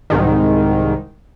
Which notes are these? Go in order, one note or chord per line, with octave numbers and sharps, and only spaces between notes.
C2 G#2 D#3